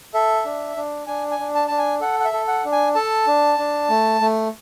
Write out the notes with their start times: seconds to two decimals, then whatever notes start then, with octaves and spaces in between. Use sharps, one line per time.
0.14 A4 E5
0.45 D4
0.76 D4
1.07 D4 G#5
1.31 G#5
1.39 D4
1.55 A5
1.68 D4 A5
1.78 G#5
2.01 A4 F#5
2.20 F#5
2.25 E5
2.33 A4
2.48 F#5
2.65 D4
2.72 G#5
2.95 A4 A5
3.27 D4
3.58 D4
3.90 A3
4.21 A3